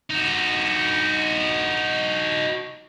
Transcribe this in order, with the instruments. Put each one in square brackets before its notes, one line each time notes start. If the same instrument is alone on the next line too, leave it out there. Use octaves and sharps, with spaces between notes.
[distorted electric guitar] D#4 F#4